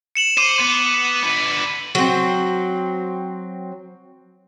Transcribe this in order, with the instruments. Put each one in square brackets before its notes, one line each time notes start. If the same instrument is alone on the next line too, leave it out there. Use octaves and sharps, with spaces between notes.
[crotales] C#7 E7 F#7
[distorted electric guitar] C5 [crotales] D6 D#7
[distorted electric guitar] B3
D3 B4
[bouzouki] F#3 C4